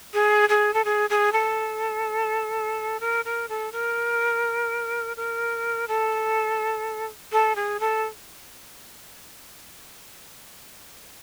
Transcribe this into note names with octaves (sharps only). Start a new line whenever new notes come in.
G#4
G#4
A4
G#4
G#4
A4
A#4
A#4
A4
A#4
A#4
A4
A4
G#4
A4